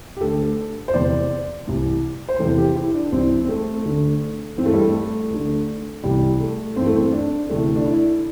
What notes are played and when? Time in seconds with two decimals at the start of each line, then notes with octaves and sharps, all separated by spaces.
0.17 G4
0.20 D2 D3 A4
0.88 C5
0.93 E2 C3 E3 D5
1.67 C2 C3 E3
2.29 C5
2.39 E2 C3 E3 A4
2.58 G4
2.75 E4
2.94 D4
3.12 C2 C3 E3 C4
3.45 C4
3.49 A3
3.85 D2 D3
4.57 E3 C4
4.61 G2 A3
4.73 G3
4.81 A3
5.30 D2 D3
6.03 C2 C3 E3 G3
6.40 A3
6.76 G2 E3 C4
6.86 A3
6.96 C4
7.13 D4
7.49 D2 C3 E3 A3
7.76 D4
7.86 E4